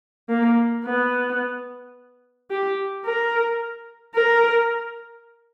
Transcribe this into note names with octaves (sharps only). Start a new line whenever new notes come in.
A#3
B3
G4
A#4
A#4